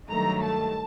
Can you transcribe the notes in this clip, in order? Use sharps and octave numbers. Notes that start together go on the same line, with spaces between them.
G2 D#3 F#3 A3 A#5
A5